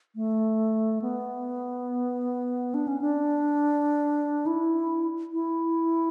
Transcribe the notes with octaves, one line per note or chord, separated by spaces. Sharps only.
A3
B3
D4
C#4
D4
E4
E4